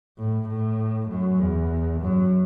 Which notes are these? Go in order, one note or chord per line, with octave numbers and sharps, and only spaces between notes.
A2
A2
F#2
E2
F#2